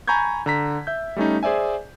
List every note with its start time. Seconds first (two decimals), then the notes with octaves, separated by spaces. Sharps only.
0.08 G#5 A#5 B5 C#6 G6 G#6
0.46 D3 A#5 B6
0.87 E5 G6
1.16 G3 A3 C#4 D#4
1.43 G#4 C5 D5 E5 G#5